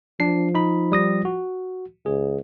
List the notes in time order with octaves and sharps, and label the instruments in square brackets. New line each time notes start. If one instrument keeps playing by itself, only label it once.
[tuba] F3 [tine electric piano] D4 C7
[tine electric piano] D#4 B5
G3 D#6 A#6
F#4
[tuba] C#2 [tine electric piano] G#4